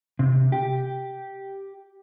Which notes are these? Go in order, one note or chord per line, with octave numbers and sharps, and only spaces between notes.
C3
G4